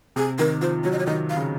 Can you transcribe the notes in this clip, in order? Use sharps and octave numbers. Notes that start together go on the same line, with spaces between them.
C3 G#4
D#3 A#4
F3 C5
F#3 C#5
D#5
C#5
D#3 D#5
F5
C#3